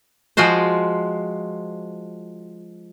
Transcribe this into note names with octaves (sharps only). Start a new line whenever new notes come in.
F3 G#3 F4 F#4 C5